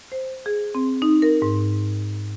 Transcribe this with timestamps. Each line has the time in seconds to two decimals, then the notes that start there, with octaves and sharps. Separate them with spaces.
0.12 C5
0.46 G#4
0.75 C4
1.02 D#4
1.22 A#4
1.42 G#2